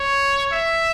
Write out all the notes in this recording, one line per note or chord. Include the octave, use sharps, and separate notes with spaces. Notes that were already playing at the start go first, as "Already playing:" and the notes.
Already playing: C#5
E5